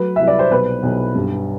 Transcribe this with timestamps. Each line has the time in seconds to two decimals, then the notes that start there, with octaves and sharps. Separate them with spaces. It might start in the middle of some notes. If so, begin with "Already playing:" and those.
Already playing: F#3 A3 B4
0.16 C2 E5
0.27 D5
0.39 C5
0.50 B1 B4
0.83 B1
1.15 G2